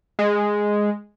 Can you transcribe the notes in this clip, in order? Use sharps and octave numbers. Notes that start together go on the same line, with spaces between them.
G#3